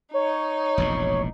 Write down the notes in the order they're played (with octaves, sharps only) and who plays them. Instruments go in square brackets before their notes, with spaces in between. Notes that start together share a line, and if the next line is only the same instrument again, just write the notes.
[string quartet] D#4 [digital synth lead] C#5
[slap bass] E1 A#1 A2